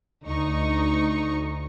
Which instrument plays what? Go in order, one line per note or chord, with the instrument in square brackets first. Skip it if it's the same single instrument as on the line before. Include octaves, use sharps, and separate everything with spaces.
[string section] D2 D#4 C#6